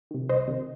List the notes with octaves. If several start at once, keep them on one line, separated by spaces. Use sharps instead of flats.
C3 D#3
C2 C5 D#5
C3 D#3